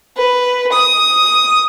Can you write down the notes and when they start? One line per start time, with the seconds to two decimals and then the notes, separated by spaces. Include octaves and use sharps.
0.17 B4
0.72 D#6